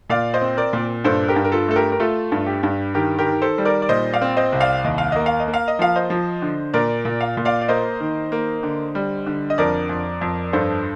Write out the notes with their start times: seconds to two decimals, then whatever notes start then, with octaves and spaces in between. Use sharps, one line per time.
0.10 A#2 D5 F5
0.34 C5 D#5
0.41 C4
0.57 A#4 D5
0.73 A#2
1.04 G2 A4 C5
1.28 G4 A#4
1.36 G2
1.44 A#4
1.52 F4 A4
1.68 A3 A4
1.76 G4 A#4
1.92 A#4
2.00 A3 F4 A4
2.32 G2
2.47 G4
2.63 G2
2.94 D#3 G4 A#4
3.18 G4 A#4
3.26 D#3
3.42 A4 C5
3.58 G3
3.65 A#4 D5
3.82 D5
3.89 A#2 C5 D#5
4.13 D5 F5
4.22 C4
4.37 C5 D#5
4.52 C2
4.60 D5 F5
4.84 D#2 D#5
4.98 F5
5.12 A#3 D#5
5.26 F5
5.40 D#5
5.48 A#3
5.54 F5
5.68 D#5
5.79 F3 F5
5.95 C5 D#5
6.10 F3
6.42 D3
6.74 A#2 A#4 D5
7.05 A#2
7.21 F5
7.37 A#2
7.45 D5 F5
7.61 D5
7.68 A#3 C5 D#5
8.00 D#3
8.32 A#3
8.63 D3
8.95 G3
9.26 D3
9.50 D#5
9.58 F2 A#4 D5
9.89 F2
10.21 F2
10.53 G2 A4 C5